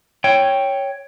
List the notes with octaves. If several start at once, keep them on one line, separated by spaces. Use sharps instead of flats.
C#5 G5